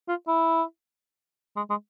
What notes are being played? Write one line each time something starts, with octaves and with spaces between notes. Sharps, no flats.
F4
E4
G#3
G#3